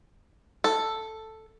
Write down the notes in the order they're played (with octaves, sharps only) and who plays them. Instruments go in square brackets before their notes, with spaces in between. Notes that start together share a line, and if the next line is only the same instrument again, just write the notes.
[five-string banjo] A4